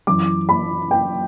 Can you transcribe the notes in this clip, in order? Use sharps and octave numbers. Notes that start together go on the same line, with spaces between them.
F#2 E3 D6
B5
G5